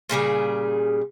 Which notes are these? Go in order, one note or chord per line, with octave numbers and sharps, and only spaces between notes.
A#2 C#3 G3 G#4